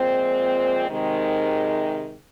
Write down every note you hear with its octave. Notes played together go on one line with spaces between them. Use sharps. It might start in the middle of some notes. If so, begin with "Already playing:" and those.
Already playing: A#2 F3 G#3 C4
C3 D#3 G#3